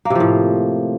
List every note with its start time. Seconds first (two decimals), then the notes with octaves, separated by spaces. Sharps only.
0.05 A#3
0.10 C3
0.15 F3
0.20 A2